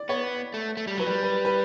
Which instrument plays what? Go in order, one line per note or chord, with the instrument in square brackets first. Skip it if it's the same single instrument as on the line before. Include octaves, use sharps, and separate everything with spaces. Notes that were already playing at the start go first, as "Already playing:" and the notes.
Already playing: [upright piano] D5
[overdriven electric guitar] B3 [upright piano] C#5
[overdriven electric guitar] A3
A3
G3
[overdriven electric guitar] F#3 [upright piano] B4
[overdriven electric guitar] G3
[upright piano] B4
B4